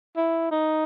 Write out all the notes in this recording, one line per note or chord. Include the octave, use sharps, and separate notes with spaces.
E4
D#4